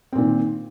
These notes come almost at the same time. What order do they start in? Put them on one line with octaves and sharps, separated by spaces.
C4 A#2 D#3